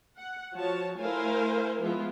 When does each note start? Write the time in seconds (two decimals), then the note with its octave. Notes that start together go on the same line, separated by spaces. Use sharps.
0.17 F#5
0.56 F3 F#4 C#5 A5
1.00 A3 E4 A#4 C5 F5 G#5
1.80 F3 G#3 B3 E4 F4